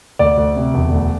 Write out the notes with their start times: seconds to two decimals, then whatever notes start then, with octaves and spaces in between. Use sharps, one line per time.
0.19 D2 D5
0.37 D2
0.56 C3
0.74 E1
0.91 D2